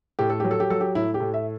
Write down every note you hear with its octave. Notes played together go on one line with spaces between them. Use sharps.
A2 G4
A4
F#3 G4
A4
G4
F#3 A4
G4
A2 E4
G4
A2
E5